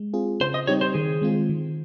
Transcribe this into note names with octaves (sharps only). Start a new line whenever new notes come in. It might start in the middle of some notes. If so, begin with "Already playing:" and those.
Already playing: G#3
C4 F4 G#4
C#3 C5
D#5
G3 C4 D#4 G4 C#5
C5
D#3 G#4
G#3 C4 F4
D#3